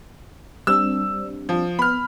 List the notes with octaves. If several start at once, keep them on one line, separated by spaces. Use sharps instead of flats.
G3 C4 D4 E6
F3
B3 B5 F6